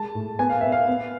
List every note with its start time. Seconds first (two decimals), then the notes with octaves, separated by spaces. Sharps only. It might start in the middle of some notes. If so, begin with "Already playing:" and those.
Already playing: G#3 A5
0.15 A2
0.39 B3 G#5
0.49 F5
0.61 B3 E5
0.72 F5
0.88 B3